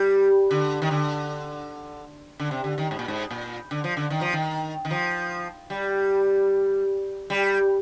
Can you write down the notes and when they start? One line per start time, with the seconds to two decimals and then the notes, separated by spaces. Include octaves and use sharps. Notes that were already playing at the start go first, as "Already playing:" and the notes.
Already playing: G3
0.51 D3
0.82 D#3
0.91 D3
2.40 D3
2.51 C3
2.64 D3
2.78 D#3
2.91 G#2
2.99 A#2
3.08 G#2
3.31 A#2
3.71 D3
3.84 F3
3.97 D3
4.10 D#3
4.21 F3
4.33 D#3
4.85 D#3
4.91 F3
5.70 G3
7.30 G3